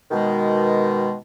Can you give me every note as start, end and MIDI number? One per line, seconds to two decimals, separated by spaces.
0.11 1.15 47
0.11 1.15 51
0.11 1.15 56